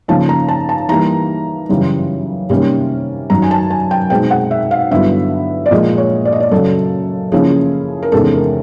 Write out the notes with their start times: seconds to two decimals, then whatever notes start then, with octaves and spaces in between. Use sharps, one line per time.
0.08 C#3 F3 A#3 D#4 A5
0.29 A#5
0.48 A5
0.69 A5
0.89 E3 G3 A#3 D#4 A#5
1.69 F#2 C#3 E3 G3
2.50 C3 D#3 G3 A#3 C#4
3.30 F#2 D#3 F#3 A#5
3.42 G#5
3.51 A5
3.70 G#5
3.91 G5
4.10 B2 G#3 C4 D#4 G5
4.31 F#5
4.51 E5
4.71 F5
4.91 G2 D3 F#3 B3 E4 E5
5.66 D5
5.71 A#2 F3 G#3 D#5
5.98 C#5
6.25 D5
6.32 D#5
6.40 D5
6.51 F#2 C#3 F#3 A4
7.32 C#3 F3 A#3 C#4 E4 G#4
8.03 A#4
8.12 E2 C3 D#3 G#3 C#4 A4
8.33 A#4